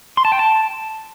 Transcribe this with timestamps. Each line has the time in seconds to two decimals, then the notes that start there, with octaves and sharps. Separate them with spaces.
0.17 C6
0.25 A5
0.32 G5
0.39 A5